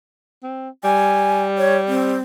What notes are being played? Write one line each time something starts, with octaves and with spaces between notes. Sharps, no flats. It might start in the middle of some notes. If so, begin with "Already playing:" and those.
C4
G3 G#5
C#5
C4